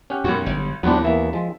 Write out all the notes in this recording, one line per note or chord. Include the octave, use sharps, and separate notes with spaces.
C#4 G4 F#5
B1 F#2 F#4
G1
D#2 A2 F#3 B3 C4 D4
E3 A#3 B3 E5
F3 G#3